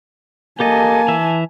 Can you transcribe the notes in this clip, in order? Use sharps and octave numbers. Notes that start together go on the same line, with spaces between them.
A#3 G4 A4 D#5 G#5 A5
E3 E5